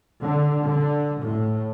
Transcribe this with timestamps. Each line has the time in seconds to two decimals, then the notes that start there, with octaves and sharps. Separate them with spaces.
0.20 D3
0.63 D3
1.23 A2